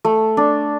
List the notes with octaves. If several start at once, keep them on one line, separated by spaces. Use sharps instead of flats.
A3
D4